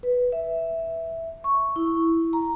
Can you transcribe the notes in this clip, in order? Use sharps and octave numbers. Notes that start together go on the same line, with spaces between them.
B4
E5
C#6
E4
A#5